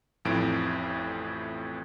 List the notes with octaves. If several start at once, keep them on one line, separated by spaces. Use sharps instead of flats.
A1 F2 A2 E3 D7